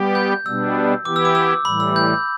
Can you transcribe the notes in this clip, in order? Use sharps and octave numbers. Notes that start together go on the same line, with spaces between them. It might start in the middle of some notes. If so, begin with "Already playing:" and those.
Already playing: G3 B3 G4
G6
B2 G3 B3 D4 E6
E3 B3 E4 G4 D6
E6
D6
E6
A2 E3 G3 B5
E6
G6